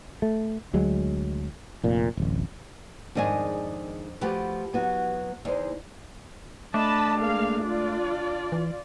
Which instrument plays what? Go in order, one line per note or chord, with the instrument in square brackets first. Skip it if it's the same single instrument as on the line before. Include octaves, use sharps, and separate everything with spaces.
[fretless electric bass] A3
D2 F#3 G#3
F1 A#2
D1 A1
[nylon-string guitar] F2 D4 D#5 [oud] G#2 D#3 G#4
[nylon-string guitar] F3 A3 F#4 [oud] G4 B4
[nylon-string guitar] F#3 B3 F#4
[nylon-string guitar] E2 C5 [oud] D#4
[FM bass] A3 [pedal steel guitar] D4 [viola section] D#5 A5 B5
[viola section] G#3 A#3 F5
F4 D5
[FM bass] E3